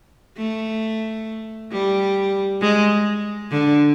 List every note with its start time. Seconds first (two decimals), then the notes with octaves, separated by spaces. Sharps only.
0.38 A3
1.72 G3
2.61 G#3
3.51 D3